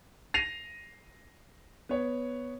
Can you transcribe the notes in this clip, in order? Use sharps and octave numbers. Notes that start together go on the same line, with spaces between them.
A#6 C7 D#7 F7
B3 C#5